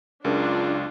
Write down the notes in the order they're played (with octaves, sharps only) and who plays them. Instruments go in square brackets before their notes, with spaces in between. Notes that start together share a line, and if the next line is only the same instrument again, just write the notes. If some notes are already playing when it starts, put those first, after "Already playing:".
[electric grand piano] C#2 F#2 [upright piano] C#3 A#4 [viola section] D4 F4